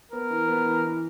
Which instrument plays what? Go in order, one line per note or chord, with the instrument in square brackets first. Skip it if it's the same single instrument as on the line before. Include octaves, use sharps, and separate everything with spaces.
[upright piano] B3 [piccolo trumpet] A#4
[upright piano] E3
B3
E3
E3